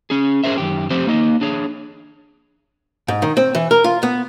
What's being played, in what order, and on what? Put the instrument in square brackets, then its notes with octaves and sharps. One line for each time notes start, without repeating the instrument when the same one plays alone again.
[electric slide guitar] C#4 G#4
C#4 G#4 A#4 C5 E5
F#2 D#3 G4
F3 A3 C4 G4 C5
A#3 D#4 D#5
D4 G#4 C#5
[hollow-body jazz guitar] G#2
D#3
C4
E3
A#4
F4
B3